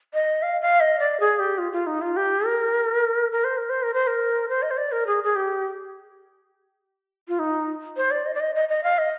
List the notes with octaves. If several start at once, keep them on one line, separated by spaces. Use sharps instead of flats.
D#5
F5
F5
D#5
D5
G#4
G4
F4
F4
D#4
F4
G4
A#4
A#4
C5
A#4
C5
A#4
C5
A#4
C5
D#5
C5
D5
A#4
G#4
G#4
G4
F4
D#4
C5
D5
D#5
D5
D#5
D#5
D#5
F5
D#5